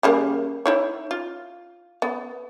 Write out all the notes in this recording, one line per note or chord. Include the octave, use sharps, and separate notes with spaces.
C#3 G3 A#3
D#4 E4 C#5
F4
B3